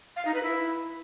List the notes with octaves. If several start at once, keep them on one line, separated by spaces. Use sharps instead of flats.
F5
D#4
B4
E4